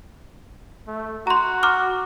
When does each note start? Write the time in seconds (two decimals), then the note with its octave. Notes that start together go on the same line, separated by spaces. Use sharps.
0.88 A3
1.27 F#4 A#5 C6
1.63 A#5 D6 F6